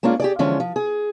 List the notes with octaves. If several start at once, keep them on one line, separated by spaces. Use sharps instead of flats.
G#3 A#3 C#4 D4 F4
G4 G#4 D5
D3 E3 F3 G#3 C#4
F3
G#4